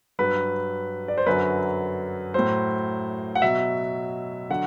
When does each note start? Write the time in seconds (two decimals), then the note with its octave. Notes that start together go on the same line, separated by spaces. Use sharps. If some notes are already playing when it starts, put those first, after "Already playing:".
0.19 G2 F#3 B4
1.08 D5
1.18 C5
1.26 F#2 D3 F#3 B4
2.34 A2 F#3 C5
3.35 F#5
3.42 B2 F#3 E5
4.50 D3 F#3 F#5